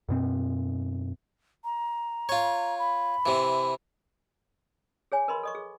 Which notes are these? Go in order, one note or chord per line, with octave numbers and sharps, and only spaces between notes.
F#2 B2 C4
A#5
F4 C#5
B5
C3 E3
G#4 C#5 G#5
A#4 B4 D#5 B5 C6
A4 D#5 C#6
G#4